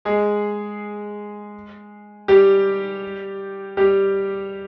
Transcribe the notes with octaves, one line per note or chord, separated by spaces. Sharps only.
G#3 G#4
G3 G4
G3 G4